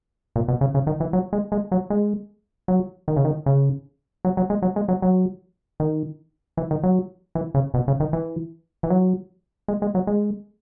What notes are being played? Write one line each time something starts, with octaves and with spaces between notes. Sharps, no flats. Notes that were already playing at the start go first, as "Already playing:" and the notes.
A#2
B2
C#3
C#3
D#3
E3
F#3
G#3
G#3
F#3
G#3
F#3
D#3
C#3
D#3
C#3
F#3
F#3
G#3
F#3
G#3
F#3
F#3
D#3
E3
D#3
F#3
E3
C#3
B2
C#3
D#3
E3
E3
F#3
G#3
G#3
F#3
G#3